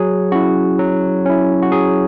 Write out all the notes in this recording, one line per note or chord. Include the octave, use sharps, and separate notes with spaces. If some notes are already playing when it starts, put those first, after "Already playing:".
Already playing: F#3 G#4
C#4 E4 F#4
F#3
C#4 E4
F#4
F#3 G#4